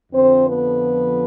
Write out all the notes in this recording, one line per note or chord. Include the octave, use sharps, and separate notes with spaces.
F2 D3 F3 C4 C5
B3 B4